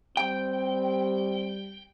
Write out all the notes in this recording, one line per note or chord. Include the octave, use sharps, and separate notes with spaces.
G3 C4 G5